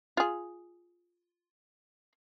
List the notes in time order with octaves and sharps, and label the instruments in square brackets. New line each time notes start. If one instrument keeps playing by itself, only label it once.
[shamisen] F4 G#4